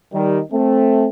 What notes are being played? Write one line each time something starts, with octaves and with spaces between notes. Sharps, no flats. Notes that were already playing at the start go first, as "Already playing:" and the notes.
D#3 G3
A3 C4